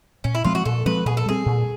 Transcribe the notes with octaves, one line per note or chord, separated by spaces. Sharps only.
A#2 C#4
E4
F3 G#3 C4 F4
F#4
A#2 A4
F3 G#3 C4 B4
A#2 G#4
A4
G3 C4 G#4
A#2